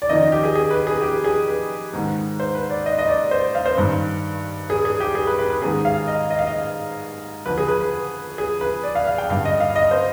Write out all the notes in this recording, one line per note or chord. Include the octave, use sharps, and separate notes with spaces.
D5
F2 D#3 D#5
D#5
G4
G#4
G#4
B4
G#4
G4
G#4
B4
G#2 D#3
C5
B4
D5
D#5
D#5
D5
C5
F5
C5
G2 D#3 B4
G#4
G#4
G4
G#4
B4
B4
B4
G#2 D#3 G#4
F5
D#5
D#5
F5
D#5
F2 D3 B4
G#4
B4
B4
G#4
B4
D5
F5
F5
G5
G2 D3 F5
D#5
F5
D#5
C5